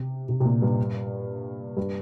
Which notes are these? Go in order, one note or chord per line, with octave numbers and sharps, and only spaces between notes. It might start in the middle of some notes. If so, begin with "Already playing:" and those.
Already playing: C3
C3
C3
A#2
G2
G2